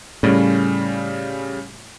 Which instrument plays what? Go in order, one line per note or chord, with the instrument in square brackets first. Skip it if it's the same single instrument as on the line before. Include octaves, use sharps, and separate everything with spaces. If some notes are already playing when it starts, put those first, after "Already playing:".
[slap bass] A2 [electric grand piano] C#3 G3 C#4